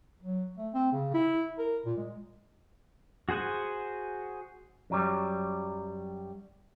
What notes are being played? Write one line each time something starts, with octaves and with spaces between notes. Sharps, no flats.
F#3
A3
C4
C#3
E4
A#4
A#2
G#3
F#4 G#4 C5 F#5 G#5
F#2 F#3 G3